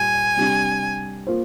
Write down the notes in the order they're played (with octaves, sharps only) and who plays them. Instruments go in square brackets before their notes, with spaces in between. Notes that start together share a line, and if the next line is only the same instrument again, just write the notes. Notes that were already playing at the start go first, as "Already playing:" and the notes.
Already playing: [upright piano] A#2 G3 [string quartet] G#5
[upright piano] C3 G3 D4 G4
A#3 F4 C5